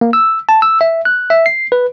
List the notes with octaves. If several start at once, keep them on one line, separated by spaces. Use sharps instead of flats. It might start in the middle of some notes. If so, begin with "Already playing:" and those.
A#3
E6
A5
E6
E5
F#6
E5
C7
B4